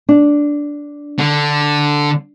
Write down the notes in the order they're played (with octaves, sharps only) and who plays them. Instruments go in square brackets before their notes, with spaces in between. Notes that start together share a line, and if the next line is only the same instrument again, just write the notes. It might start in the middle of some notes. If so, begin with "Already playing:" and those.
[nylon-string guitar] D4
[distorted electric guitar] D3